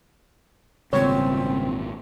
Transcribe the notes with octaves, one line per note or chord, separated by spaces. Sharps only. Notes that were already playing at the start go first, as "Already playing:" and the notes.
G#1 E2 A#2 C#3 G3 C4 C#5